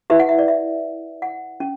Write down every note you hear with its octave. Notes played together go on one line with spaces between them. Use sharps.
E4 G4 B4 E5
F#5
E5
D5
E5
F#5
C#4